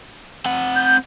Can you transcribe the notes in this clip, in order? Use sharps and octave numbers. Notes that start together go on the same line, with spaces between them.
C4 F#5
G6